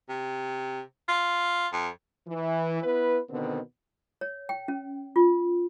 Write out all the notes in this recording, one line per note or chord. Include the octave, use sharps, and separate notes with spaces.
C3
F4
F2
E3
B3 E4 B4
B2 D3 D#3 B3 C4
C#5
G5
C#4
F4